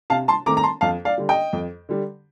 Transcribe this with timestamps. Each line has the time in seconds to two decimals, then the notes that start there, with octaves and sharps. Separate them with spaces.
0.10 C3 F5 A5
0.28 A5 C6
0.46 D#3 A3 C4 A#5 D6
0.57 A#5
0.63 A5 C6
0.81 F2 F5 A5
1.05 D5 F5
1.18 D3 G3
1.29 D#5 G5
1.53 F2
1.89 D3 G3